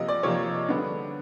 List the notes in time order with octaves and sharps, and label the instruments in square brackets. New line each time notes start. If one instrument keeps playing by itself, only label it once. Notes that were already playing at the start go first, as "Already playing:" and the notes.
Already playing: [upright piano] C3 F3 A#3 D#5
D5
C3 F3 A#3 C#5
D3 G3 B3 D4